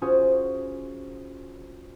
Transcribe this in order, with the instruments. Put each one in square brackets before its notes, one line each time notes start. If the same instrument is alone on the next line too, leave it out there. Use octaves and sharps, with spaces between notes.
[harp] C#4 F4 F#4 G#4 C5